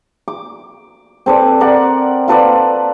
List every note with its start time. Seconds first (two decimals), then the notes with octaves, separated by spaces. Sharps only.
0.28 D6
1.26 C4 A4 B4 D5
1.60 A#4 D5 F#5
2.28 F4 A4 B4 D5